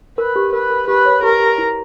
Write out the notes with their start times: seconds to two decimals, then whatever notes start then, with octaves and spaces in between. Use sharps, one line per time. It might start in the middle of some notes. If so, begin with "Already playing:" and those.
0.18 A#4 B4
0.36 G4
0.53 A#4 B4
0.70 A#4
0.88 G4 B4
1.05 C#5
1.23 G4 A#4
1.40 G4
1.58 E4